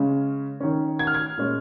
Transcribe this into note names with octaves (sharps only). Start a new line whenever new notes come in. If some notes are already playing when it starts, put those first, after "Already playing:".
Already playing: C#3 G#3 C#4
D#3 C#4
G#6
F6
G#6
A#2 G#3 C#4